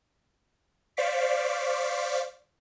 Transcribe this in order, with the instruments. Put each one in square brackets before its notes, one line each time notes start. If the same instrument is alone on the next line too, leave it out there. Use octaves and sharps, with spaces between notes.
[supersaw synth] C5 D5 F5 C#6 D6 B6